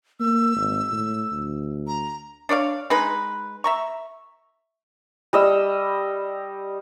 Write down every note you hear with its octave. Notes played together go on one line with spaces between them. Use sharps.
A#3 E6
G#1
A2
D2
A#5
D4 C#5 D5 F5
G#3 D#4 B4
E5 A#5 C#6
G3 D#5 E6